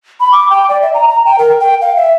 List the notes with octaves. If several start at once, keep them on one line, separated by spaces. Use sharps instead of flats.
B5
D6
G5
D5
E5
A#5
A#5
G5
A#4
G5
F5
E5